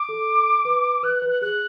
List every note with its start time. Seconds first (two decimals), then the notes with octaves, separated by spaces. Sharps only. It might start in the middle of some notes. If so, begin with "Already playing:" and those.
Already playing: D6
0.09 A4
0.65 B4
1.03 B4 F#6
1.15 F#6
1.22 B4
1.28 F#6
1.41 G#4 F#6